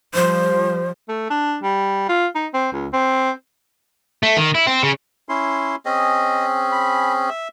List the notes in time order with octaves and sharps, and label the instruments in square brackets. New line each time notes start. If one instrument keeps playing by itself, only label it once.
[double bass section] F3 G3 [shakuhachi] C5
[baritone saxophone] A3
D4
G3
F4
D#4
C4
C#2
C4
[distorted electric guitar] A3
D#3
E4
C4
C#3
[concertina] C#4 E4 C6
[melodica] C4 C#4 G#4 [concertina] D#5
[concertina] B5
E5